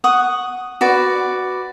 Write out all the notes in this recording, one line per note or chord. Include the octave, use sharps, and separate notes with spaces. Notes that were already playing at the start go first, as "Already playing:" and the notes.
F#5 C#6 D#6
F#4 B4 D5